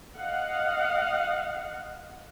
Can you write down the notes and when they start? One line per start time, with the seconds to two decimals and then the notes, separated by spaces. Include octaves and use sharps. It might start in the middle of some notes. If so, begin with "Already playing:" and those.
0.17 D#5 F5 F#5